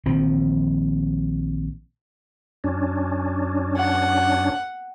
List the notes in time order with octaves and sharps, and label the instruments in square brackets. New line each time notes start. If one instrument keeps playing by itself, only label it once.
[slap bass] A#1 D#3 F3 C4
[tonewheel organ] F#2 C#4 D4
[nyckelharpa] F#5